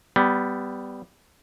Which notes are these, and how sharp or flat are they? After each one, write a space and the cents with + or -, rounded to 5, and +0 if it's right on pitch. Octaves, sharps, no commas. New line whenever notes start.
G3 +0 B3 +20